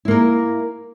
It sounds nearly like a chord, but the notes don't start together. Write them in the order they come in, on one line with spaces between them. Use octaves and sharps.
E4 A#3 A#4